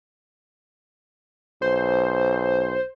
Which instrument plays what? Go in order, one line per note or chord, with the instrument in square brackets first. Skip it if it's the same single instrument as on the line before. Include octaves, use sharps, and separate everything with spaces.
[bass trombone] B1 [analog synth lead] C5